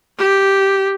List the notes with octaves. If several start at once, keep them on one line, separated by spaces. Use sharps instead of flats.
G4